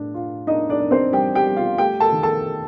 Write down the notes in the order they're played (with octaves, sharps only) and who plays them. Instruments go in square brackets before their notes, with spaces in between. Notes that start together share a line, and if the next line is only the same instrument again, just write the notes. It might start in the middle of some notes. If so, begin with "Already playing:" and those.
Already playing: [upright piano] A2 D4
F4
D4 D#4 D#5
D4 D5
D4
C4 C5
G3 G4 G5
G4 G5
G3
F4 F5
A3 G4 G5
A4 A5
D#3
A4 A5